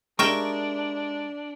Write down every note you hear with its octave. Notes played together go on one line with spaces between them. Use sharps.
G#3 D4 D#4 G4 A#4 E5 G5 C#6